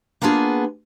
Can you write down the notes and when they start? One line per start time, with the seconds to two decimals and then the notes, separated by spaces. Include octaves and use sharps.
0.22 A#3 B3 D4 F4 G#4